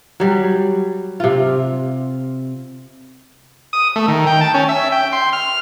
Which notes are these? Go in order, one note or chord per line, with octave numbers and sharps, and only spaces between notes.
F#3 G3
C3 F4
D#6
A3
D#3
G5
A5
C#4
E5
G5
C6
F6